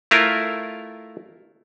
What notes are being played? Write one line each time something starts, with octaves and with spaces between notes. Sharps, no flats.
A3 E4 F4 A#4